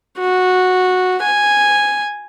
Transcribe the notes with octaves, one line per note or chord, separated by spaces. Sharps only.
F#4
G#5